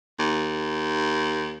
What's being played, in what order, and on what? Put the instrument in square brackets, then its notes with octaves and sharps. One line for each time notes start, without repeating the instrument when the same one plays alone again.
[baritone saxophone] D#2